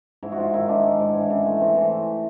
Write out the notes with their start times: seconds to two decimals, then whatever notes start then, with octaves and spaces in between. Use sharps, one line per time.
0.23 G#2 E4
0.32 F#4
0.38 G#2 F4
0.53 D#3 E4
0.68 D#3 D4
0.84 G#3
0.99 G#2
1.15 E3
1.30 C#3
1.45 A3
1.61 E3 C4
1.76 E3